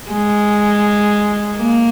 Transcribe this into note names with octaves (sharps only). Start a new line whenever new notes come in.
G#3
A#3